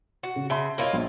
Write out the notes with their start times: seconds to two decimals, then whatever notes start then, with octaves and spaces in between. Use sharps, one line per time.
0.23 F#4
0.36 C#3
0.50 C#3 E5 A5 C6
0.78 A#3 E4 F4 C#5 D#5
0.93 A#1